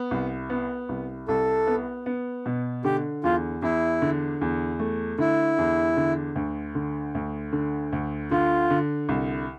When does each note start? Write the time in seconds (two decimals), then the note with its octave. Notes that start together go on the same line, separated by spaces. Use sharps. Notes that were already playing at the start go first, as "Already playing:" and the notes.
Already playing: B3
0.11 C2
0.50 B3
0.89 C2
1.28 C2 A4
1.67 B3
2.06 B3
2.46 B2
2.84 D3 G4
3.24 E2 F4
3.62 E2 E4
4.02 D3
4.41 E2
4.79 A3
5.18 D3 E4
5.58 E2
5.97 D3
6.36 D2
6.75 D3
7.15 D2
7.52 D3
7.92 D2
8.31 D3 F4
8.70 D3
9.09 C2